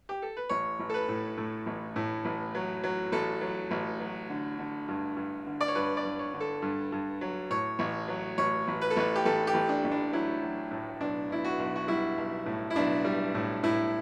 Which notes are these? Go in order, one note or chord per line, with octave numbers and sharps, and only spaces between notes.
G4
A4
B4
A1 C#5
A1
A4
B4
A2
A2
A1
A2
A1
F#3
F#3
A1 A4
F#3
A1
F#3
D3
D3
G2
G2
D3
D5
C#5
G2 B4
D5
G2
C#5
D3
A4
G2
G2
F#3
A2 C#5
A1
F#3
A1 C#5
A1
B4
A4
A1 B4
G4
A1 A4
G4
A1
D4
A1
D4
F#3 E4
F#3
A2
B1 D4
B1 E4
F#4
B1
F#4
G3 E4
B1
A2
E4
B1 D4
G3
A2
A2 E4